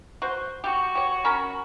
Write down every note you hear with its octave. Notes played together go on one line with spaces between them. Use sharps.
F#4 C5
F#4 G4
G4 C#5
C#4 A#4 B5